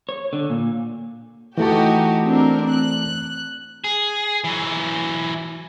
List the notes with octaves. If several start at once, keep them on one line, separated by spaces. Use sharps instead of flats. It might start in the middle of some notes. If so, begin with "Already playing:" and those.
C#5
D3
A#2
E3 A3 D#4 F#4 G4 A5
C4 D4 A#4
F#6
G#4
E3 F#3